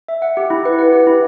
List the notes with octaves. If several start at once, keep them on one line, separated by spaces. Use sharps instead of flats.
E5
F#5
G4
E4
B4
F#5
G4
E4